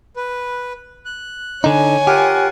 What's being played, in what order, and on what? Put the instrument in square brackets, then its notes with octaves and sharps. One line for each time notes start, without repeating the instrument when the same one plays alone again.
[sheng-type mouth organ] B4
F#6
[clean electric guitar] D3 D#4 [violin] C#5 G#5
[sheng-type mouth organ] F4 A#4 F#5 [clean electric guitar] G4